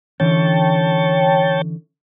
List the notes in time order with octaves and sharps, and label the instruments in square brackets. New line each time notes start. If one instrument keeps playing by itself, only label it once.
[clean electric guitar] D3 E3 C#4 [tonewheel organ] C#5 G5 A5